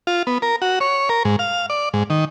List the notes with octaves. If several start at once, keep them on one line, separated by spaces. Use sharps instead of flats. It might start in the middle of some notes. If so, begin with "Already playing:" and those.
F4
B3
A#4
F#4
C#5
A#4
G#2
F5
D5
G#2
D#3